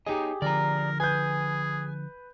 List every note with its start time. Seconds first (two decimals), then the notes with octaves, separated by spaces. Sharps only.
0.06 D#4 G4 G#4 C#5 D#5
0.42 D3 F3 A#4 D5 A#5
1.00 G#4 B4 G#5 G6